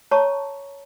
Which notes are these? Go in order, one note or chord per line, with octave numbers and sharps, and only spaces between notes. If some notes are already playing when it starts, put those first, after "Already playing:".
C#5 A5 A#5 C#6